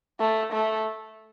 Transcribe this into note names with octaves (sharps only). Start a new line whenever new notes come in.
A3
A3